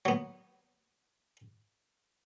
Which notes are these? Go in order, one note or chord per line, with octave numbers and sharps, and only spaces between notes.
F#3 B3